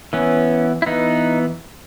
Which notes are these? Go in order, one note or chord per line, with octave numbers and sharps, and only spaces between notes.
E3 B3 C#4
E4
E3 B3 D#4